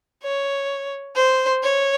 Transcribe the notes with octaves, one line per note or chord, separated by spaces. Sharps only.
C#5
C5
C#5